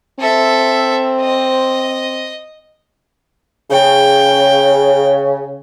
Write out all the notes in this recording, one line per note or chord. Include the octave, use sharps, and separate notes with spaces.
C4 A4 E5
D#5
C#3 G5